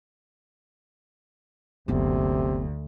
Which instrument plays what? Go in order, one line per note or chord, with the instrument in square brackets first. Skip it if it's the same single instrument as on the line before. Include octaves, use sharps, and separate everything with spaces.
[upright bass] F#1 B3 [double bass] D2 [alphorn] C3